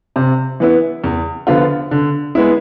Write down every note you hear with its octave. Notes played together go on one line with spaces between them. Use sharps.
C3
E3 B3 E4
E2
D3 F3 B3 F4
D3
G#3 B3 E4